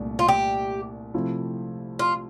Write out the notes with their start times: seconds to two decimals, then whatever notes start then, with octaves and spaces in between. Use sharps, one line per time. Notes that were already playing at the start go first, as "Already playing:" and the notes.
Already playing: C2 A#2 A3 D4
0.19 F4
0.28 G4
1.14 C3 F3 A3 E4
1.99 F4